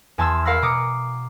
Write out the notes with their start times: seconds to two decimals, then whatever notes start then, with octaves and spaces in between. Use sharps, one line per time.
0.18 E2 G#5 A5 C6 E6 E7
0.45 A#4 F5 F#5 B5 E6 A#6
0.62 B2 A#5 D6 D#6 C#7